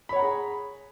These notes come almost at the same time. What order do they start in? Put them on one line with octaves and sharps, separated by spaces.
B5 C#5 F#5 A#5 G#4